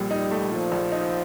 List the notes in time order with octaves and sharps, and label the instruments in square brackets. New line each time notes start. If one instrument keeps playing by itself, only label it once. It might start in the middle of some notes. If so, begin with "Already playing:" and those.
Already playing: [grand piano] A#1 A#2 [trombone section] G3
[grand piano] D#4
A3
[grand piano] A#2 [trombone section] F3
[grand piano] A#1
D#4